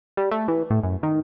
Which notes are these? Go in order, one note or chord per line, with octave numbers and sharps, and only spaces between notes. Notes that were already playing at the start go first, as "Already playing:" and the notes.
G3
A3
E3
A2
F#2
D#3